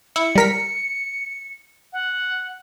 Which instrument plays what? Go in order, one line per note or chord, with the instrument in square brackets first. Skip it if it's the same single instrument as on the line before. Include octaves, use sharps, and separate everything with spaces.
[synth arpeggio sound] E4 [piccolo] C#7
[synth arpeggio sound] G3 A#4 B6
[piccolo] F#5